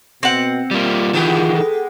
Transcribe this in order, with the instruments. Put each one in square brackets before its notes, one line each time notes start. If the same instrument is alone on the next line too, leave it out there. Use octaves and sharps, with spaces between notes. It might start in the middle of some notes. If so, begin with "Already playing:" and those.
[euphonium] B2 [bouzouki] C4 F#5
[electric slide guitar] G3 A#3 [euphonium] F4
[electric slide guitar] D#3 E3 [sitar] G#3 B3 G4
[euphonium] A4